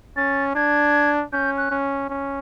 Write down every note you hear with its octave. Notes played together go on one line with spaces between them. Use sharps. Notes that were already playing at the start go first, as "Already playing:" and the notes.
C#4 A6
D4 G#6
C#4 G6
F#6
C#4
C#4